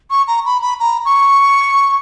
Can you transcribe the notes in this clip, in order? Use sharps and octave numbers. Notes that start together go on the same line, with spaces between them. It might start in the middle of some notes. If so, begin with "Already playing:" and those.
C#6
A#5
B5
B5
A#5
C#6